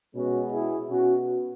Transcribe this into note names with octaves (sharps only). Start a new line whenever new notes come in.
B2 G#3 B3 C#4 F#4
E4 G#4
B2 B3 C#4 F#4